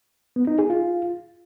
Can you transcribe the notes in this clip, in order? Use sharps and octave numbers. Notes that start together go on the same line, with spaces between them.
B3
D#4
G#4
F4